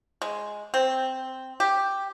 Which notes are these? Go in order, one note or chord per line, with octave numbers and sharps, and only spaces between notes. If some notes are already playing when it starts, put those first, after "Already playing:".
G#3
C4
G4